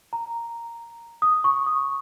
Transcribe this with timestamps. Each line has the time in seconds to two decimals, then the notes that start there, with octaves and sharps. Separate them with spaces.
0.13 A#5
1.22 D#6
1.44 C#6
1.66 D#6